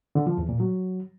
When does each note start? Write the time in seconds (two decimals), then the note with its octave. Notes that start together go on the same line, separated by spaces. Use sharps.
0.15 D3
0.27 F3
0.38 E2
0.49 A#2
0.60 F#3